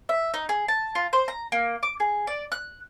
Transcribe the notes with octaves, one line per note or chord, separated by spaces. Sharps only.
E5
D#4
G#4
A5
F4
C5
A#5
A#3
D6
G#4
D5
F#6